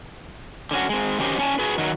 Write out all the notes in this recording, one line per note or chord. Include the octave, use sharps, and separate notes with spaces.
D3 C#4 F#4
G#3 C4
D#3 F#3 C#4 G4 C5 D#5
A#2 C#4 C#5 G#5 A5
F#4 G#4 B4
D#3 F#3